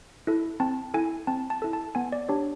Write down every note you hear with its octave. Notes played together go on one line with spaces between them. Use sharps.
E4 A4
C4 A5
E4 A4 G#5
C4 A5
A5
E4 A4
A5
B3 G#5
D5
D4 G4 C#5